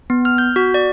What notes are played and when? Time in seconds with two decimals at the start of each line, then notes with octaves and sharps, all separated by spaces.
0.10 B3
0.25 F6
0.38 G6
0.56 F#4
0.74 D5